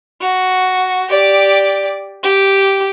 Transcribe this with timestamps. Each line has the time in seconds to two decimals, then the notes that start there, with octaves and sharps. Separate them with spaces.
0.21 F#4
1.10 G4 D5
2.23 G4